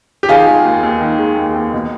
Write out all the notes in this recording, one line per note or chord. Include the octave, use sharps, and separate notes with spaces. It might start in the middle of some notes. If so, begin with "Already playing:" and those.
G4
D#3 F4 G#4
G#3
D#2
D#2
D#3
G#3
D#2
D#2
B2